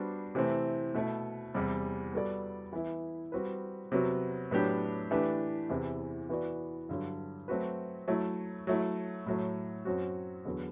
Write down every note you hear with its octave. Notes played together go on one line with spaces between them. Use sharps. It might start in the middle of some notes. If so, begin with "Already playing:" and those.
Already playing: G3 B3 D4 F#4 C5
C3 E3 A3 C4
B2 A3 E4
E2 C3 G3
G3 B3 F#4 A4 D5
E3 B3 E4
G3 C4 F#4 B4
C3 F#3 B3 F#4
A2 F#3 B3 D4 G4
E3 A3 D4 G4 B4
E2 C3 E3
E3 B3 F#4 B4 D5
G2 D3 F#3
F#3 A3 C4 F#4 B4
F#3 A3 E4
F#3 A3 E4
A2 F#3 A3
F#2 F#3 C4 F#4
E2 D3 F#3 B3